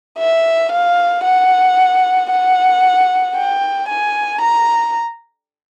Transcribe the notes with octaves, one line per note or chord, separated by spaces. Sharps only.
E5
F5
F#5
F#5
G5
G#5
A#5